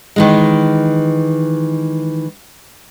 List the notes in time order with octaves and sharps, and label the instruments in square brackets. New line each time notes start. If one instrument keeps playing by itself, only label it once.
[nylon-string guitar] D#3 E3 G#3